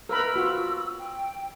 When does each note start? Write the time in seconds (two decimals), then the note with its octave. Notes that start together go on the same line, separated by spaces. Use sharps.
0.09 A#4 B4 B5 E6
0.34 F4 F#4 B5
0.98 G5